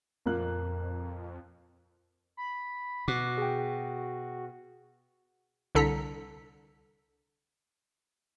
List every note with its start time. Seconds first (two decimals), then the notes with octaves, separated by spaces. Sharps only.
0.26 F2 A#2 A#3 F#6
2.37 B5
3.08 B2 F#4 D6 F#6
3.38 G#4 G5
5.75 C2 D3 A4 A#5 B6 C#7